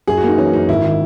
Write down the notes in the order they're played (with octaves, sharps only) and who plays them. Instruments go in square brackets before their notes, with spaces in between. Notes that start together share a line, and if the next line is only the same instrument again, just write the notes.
[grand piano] F#2 [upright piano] G#4
[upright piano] F#4
[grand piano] A#3 [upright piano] D#4
[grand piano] E3 [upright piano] C#4
[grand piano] F#2 [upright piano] D#4
[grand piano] G#1 [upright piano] E4
[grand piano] D#3